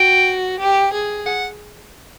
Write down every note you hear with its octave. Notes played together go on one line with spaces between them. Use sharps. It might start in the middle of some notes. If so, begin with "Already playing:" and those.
Already playing: F#4 G5
G4
G#4
F#5